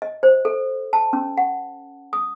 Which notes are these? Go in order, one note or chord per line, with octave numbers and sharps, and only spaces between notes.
D#5
C5
A4
A5
C#4
F#5
D#6